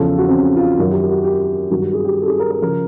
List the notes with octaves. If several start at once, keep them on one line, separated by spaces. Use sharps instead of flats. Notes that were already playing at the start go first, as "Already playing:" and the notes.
Already playing: E2 C#3 F3 A4
F#4
C4
C#4
F4
F#2 D#3 F#3 F#4
G4
G4
F#4
G4
G4
G2 D#3 F#3 F#4
G4
G#4
G4
A4
G#4
A#4
A#4
C#3 F3 A#4